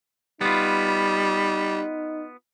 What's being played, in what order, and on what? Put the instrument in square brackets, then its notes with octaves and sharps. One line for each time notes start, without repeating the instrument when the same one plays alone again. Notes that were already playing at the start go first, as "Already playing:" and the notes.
[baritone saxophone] G3 [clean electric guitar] B3 F4 [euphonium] D#4